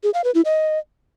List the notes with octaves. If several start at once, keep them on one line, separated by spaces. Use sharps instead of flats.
G#4
F5
B4
E4
D#5